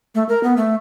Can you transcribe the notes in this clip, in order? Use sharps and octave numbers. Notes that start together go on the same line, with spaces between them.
A3
A#4
B3
A3